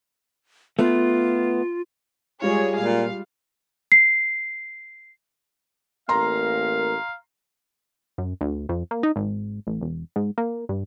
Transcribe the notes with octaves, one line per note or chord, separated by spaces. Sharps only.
A3 B3 F4
G3 G#3 F4 G#4 C#5
A#2 F5
C7
A1 A#3 A#4 F5 A#5 C6
F#2
D2
F2
A#3
D#4
G#1
A1
E1
G#2
A#3
G2